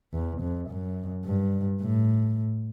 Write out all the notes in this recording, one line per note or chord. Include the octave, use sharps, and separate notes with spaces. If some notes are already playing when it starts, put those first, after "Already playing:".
E2
F2
F#2
G2
A2